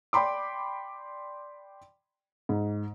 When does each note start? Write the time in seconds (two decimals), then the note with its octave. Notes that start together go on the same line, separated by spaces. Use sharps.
0.13 D5 G5 B5 C6 D6
2.49 G#2